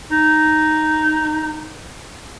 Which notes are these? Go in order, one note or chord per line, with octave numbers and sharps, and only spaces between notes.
D#4